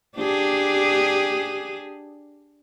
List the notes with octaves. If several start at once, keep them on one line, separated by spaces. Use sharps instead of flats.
D4 G4 G#4